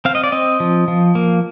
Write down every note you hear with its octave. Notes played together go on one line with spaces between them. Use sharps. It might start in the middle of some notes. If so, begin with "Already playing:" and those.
C4 F5
D#5
D5
C4 D#5
F3
F3
A#3